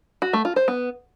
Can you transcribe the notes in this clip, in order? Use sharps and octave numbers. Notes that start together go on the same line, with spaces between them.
F#4
A3
F4
C5
B3